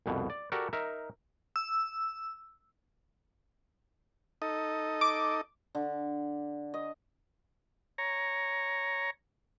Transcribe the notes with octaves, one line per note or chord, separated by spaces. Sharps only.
C2 F2 B2
D5
F#4 G4 A4 A#4 D5
D#4 A#4 E5
E6
D#4 A4 D#5
D6
D3
D#5
C#5 A#5